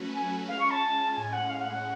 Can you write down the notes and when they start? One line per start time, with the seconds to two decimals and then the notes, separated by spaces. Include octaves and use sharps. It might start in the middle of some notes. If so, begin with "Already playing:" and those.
Already playing: F#3 A3 C#4 F#4 B4
0.15 G#5
0.48 G#3 C#4 F4 F5
0.59 C#6
0.70 A5
1.16 A2 G#3 C#4 G#5
1.32 F#5
1.49 F5
1.61 F#5
1.71 F#5